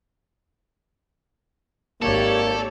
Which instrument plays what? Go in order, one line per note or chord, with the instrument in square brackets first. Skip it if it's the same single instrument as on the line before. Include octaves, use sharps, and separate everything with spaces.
[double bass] G#1 [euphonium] A#3 [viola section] G4 C#5 D5 [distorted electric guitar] A4